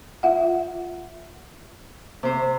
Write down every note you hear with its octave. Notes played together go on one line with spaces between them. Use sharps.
F4 E5 F#5
C3 C5